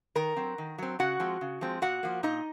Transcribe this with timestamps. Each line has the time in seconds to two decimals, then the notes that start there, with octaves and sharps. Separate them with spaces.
0.15 D#3 A#4 A#5
0.36 F#3 C4
0.58 D#3
0.78 F#3 C4
0.99 C#3 F#4 F#5
1.20 F3 G#3 C4
1.41 C#3
1.61 F3 G#3 C4
1.82 A#2 F#4 F#5
2.03 F3 A#3
2.23 A#2 D#4 D#5